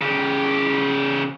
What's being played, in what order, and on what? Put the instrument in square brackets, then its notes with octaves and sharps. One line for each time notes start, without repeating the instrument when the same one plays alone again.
[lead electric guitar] C#3 G4